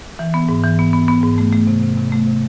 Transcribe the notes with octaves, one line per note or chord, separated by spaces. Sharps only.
E3
B3
G#2
E3
B3
B3
B3
G#2
A3
A3
C3
C3
C3
A3
C3